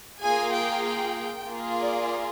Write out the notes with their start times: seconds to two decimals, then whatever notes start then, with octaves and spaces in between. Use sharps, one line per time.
0.21 A#3 F4 G#4 G#5
0.53 G5
0.84 G5
1.48 A#3 F4 G#4
1.81 D5